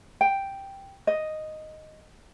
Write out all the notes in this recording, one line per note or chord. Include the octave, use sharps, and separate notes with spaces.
G5
D#5